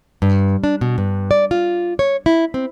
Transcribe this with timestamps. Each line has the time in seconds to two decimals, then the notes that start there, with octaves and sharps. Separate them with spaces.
0.22 G2
0.64 D4
0.81 B2
0.98 G2
1.31 D5
1.51 F4
1.99 C#5
2.26 E4
2.54 C4